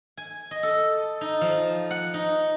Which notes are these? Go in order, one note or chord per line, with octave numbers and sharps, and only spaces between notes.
G#5
D#5
A4
D#4
F3
F#5
D#4